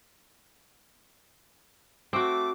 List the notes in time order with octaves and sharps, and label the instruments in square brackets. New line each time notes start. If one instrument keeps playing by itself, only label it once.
[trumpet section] A3 D6 [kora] C4 F#4